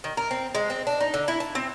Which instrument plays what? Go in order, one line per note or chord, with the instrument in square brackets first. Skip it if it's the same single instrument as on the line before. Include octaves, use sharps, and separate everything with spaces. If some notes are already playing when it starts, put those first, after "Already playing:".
[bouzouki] D#3
A#4
C4
G#3
C4
D4
D#4
D3
E4
A5
C4